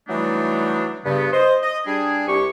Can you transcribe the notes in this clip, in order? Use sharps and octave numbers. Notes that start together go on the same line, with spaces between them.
E3 F#3 G3 A3 D4 D#4
G2 C#3 B3
C5 D#5
D#5
G3 D4 G#4
C2 G4 C#6